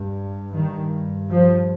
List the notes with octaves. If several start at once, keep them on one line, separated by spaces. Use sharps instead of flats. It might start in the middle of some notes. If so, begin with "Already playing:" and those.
Already playing: G2
G2 D#3
F3